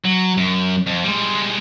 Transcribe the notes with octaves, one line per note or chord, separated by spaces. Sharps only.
F#3
F#2
F2
G3 G#3